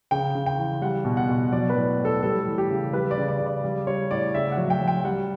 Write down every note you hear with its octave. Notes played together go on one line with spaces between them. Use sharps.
C#3 G5
C#3
G5
E3
G3 F#5
B2
F#5
B2
F#3 D5
B4
A2
A2
A4
G3 A4
E3
G4
C#3
G3 B4
D5
C#3
D5
C#3
D5
G3
G3 C#5
A2 D5
C#3 E5
F#5
F#3
G5
F#3
G5
G3 F#5